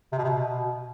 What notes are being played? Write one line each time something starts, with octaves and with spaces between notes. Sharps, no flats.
C3
B2
C3
B2